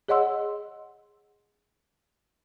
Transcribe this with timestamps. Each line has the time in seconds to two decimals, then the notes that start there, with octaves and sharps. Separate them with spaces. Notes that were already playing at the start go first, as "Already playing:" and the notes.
0.08 G#4 C#5 D#5 F#5 C6 E6